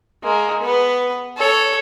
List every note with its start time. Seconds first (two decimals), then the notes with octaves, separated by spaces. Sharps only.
0.23 G#3 A#3
0.63 B3 B4
1.37 A4 C#5